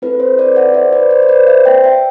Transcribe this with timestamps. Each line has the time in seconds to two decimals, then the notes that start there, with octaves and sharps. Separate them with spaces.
0.02 C4 E4 A4 B4
0.20 C5
0.39 B4 D5
0.56 D5 F#5
0.74 C5 E5
0.93 B4 D5
1.11 C5
1.22 C5
1.29 B4 D5
1.47 C5 E5
1.65 E5 G5
1.84 E5 G5